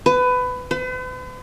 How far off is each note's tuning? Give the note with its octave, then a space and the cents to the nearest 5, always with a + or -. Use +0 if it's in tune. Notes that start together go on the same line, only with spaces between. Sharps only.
B4 +20
B4 +45